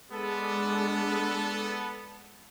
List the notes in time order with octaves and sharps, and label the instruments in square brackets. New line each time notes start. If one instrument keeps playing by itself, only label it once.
[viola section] G#3 D4 [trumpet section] B3 A4